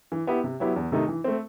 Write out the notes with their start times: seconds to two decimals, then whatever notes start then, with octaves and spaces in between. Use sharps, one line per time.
0.12 E3
0.27 B3 E4 G4
0.44 C3
0.60 F#3 B3 E4 G4
0.76 E2
0.92 C3 D#3 A3 D#4
1.08 E3
1.24 A3 C4